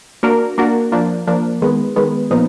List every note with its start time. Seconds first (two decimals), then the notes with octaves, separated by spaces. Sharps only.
0.23 A#3 D4 F#4 A#4
0.58 A#3 D4 F#4 A#4
0.92 F3 A#3 D4
1.27 F3 A#3 D4
1.62 D#3 G#3 B3
1.96 D#3 G#3 B3
2.31 A#2 F3 B3 D#4